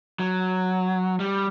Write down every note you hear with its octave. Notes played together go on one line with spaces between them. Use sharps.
F#3
G3